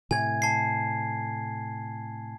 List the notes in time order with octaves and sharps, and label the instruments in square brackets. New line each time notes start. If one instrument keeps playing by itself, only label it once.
[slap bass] A2 C3 [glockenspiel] G#5 G#6
[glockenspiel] A5 C7